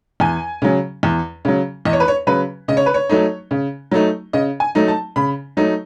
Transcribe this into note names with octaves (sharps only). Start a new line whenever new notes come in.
E2 G#5
C#3 F#3
E2
C#3 F#3
E2 D#5
C#5
B4
C#5
C#3 F#3 B4
C#3 D#5
C#5
B4
C#5
F#3 A3 D#4
C#3
F#3 A3 D#4
C#3 D#5
G#5
F#3 A3 D#4
A5
C#3 B5
F#3 A3 D#4